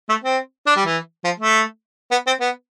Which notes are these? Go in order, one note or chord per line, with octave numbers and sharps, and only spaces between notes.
A3
C4
D4
G3
E3
F3
A3
B3
C4
B3